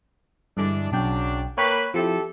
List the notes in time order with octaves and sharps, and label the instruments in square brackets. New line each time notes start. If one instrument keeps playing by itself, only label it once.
[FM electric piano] G2 D3 [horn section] E3 G#3 D4
[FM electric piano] B1 G5 [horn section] C#3 F#3 D4
[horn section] A#3 A#4 B4 [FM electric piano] C#5 G5 B5
[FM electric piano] F3 E4 [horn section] C4 G4 A4